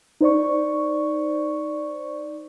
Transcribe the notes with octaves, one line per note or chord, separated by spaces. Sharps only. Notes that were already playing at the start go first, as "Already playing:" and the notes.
D#4 C5 D5 C#6